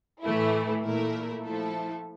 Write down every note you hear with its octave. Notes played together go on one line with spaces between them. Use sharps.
A2 E3 A3 E4
A#2 A3 E4 A#4
F3 A3 E4 A4